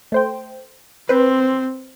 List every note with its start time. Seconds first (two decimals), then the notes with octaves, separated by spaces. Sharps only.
0.12 A3 C5 G5
1.09 C4 B4 C5